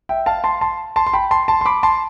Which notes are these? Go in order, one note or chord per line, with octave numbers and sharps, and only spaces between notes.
E5 G5
F5 A5
A5 C6
A5 C6
A5 C6
C6
G5 B5
A5 C6
A5 C6
C6
B5 D6
A5 C6